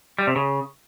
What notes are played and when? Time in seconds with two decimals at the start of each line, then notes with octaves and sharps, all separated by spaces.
0.19 G3
0.27 C3
0.36 C#3